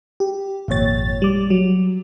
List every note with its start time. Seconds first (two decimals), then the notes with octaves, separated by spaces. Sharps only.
0.20 G4
0.68 G#1 F2 A#2 C#5 A6
1.22 G3 D6
1.50 F#3